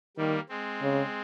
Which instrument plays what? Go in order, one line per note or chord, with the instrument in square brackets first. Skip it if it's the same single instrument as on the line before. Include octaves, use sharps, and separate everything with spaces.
[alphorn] D#3 [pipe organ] G3 A#3
[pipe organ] G#3 C4
[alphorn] C#3